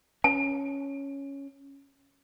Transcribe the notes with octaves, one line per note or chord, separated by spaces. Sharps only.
C#4 A5